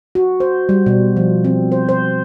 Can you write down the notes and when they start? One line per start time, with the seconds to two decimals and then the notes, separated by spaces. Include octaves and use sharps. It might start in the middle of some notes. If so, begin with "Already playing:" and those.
0.15 F#4
0.40 C5
0.69 G3
0.86 B2
1.17 F3
1.45 C4
1.72 C5
1.89 C5